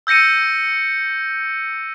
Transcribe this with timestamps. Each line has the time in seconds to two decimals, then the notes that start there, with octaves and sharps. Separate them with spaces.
0.07 E6 G6 A#6 C#7 D#7